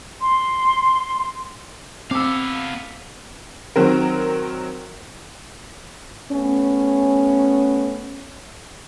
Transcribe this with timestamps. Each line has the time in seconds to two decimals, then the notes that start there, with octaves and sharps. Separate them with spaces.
0.21 C6
2.11 B3 C4 F5 D6 E6
3.76 D#3 F#3 C4 A#4
6.32 A3 B3 C#4